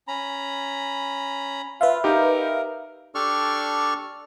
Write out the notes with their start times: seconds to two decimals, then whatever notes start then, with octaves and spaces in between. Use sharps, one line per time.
0.08 C#4 A#5 B5
1.81 F4 B4 E5 F5
2.04 D#4 G4 A#4
3.15 D4 G4 A4 D5 C#6 F6